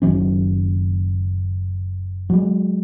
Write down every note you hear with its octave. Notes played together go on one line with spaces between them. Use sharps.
F#1 D#3 F#3 C#4
F#3 G#3